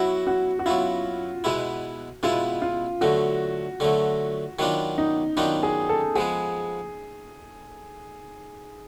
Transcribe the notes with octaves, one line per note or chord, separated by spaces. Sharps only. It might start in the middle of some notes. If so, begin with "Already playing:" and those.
Already playing: F#3 B3 E4 F#4
F#4
F#4
F#3 B3 E4 F4
B2 G#3 B3 E4
B2 G#3 B3 E4 F4
F4
D3 F#3 A3 F#4
D3 F#3 A3
D#3 F#3 B3 D4 F4
D#4
D#3 F#3 B3 D4 D#4 F4
G#4
A4
F3 G#3 B3 G#4